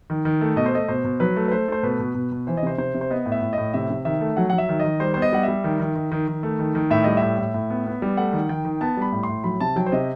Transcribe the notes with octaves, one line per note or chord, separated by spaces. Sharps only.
D#3
D#3
A3
B2 D#5
C5
A3 D#5
B2 C5
B2
F#3 B4
A3
B4
A3 C5
A3 C5
B2 B4
B2
B2
B2
E3 C5
D#5
C3 C5
C3 C5
C3
C5
B3 D#5
A2
E5
A2
D#5
A2
C3 E5
C3
D#3 E5
A3
F#3 F#5
F#3 F#5
E5
D#3
D#3 D#5
G3 C5
B3 C5
D#5
G3 F#5
E5
G3
D#3
D#3
D#3
D#3
D#3
A3
D#3
D#3
A2 E5
G3 D#5
E5
A2
A2
A2
B3
B3
G3
A3 F#5
D#3
D#3 G5
D#3
B3 A5
G3 B5
A2
C6
A2
F#3 B5
C3 A5
F#3 G5
C5
C3 D#5